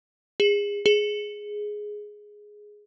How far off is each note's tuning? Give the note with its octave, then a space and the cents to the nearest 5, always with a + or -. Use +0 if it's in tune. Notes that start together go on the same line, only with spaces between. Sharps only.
G#4 -25
G#4 +5